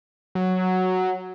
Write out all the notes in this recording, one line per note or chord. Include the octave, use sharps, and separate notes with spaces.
F#3